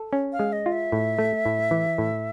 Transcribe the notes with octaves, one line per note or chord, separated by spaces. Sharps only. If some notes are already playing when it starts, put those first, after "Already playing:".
Already playing: A4
C#4
F5
G#3
D#5
F4
E5
A2
A3
A2
E3
A2